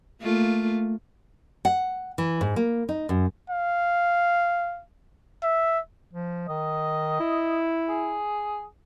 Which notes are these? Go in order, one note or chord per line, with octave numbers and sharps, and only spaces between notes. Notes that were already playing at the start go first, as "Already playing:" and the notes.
A3 A#3 F4
F#5
E3
G#2
A#3
D#4
F#2
F5
E5
F3
D#3 D#5
E4
G#4